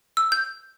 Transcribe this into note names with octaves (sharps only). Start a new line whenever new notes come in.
E6
G6